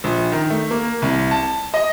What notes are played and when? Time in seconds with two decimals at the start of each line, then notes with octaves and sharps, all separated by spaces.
0.04 A#1
0.32 D#3
0.50 A3
0.71 A#3
1.02 C2
1.31 A5
1.74 D#5